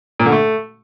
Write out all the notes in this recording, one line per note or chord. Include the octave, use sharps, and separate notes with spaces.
A#2
D3
A3